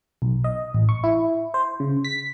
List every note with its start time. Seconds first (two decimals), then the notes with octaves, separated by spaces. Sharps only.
0.22 B1
0.44 D#5
0.74 A1
0.89 C#6
1.04 E4
1.54 C5
1.80 C#3
2.05 B6